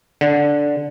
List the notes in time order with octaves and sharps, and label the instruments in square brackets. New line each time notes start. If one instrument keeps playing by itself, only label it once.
[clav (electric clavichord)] D3